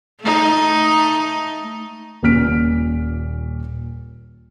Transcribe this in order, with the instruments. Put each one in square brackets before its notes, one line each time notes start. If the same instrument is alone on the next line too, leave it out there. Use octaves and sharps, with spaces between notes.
[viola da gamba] A3 D#4
[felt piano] D#1 A#2 C#4 F6 B6 D7